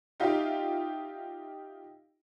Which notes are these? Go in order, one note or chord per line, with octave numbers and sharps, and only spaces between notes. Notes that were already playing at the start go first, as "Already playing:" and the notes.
D#4 F4 G4 E5 F5 G5